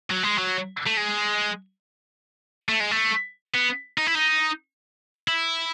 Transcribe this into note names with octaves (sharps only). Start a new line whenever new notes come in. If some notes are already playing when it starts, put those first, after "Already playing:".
F#3
G#3
F#3
A3
G#3
A3
G#3
A3
B3
D#4
E4
D#4
E4